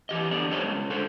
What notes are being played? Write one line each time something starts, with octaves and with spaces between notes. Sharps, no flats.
E3 G4 D#5
D3 B3 G4 D5
B3 A4 C5 C#5 D#5
C#3 G#3
D3 A4 C5